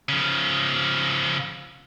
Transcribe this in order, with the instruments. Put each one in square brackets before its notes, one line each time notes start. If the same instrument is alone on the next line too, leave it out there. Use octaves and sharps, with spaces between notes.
[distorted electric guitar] C#3 F3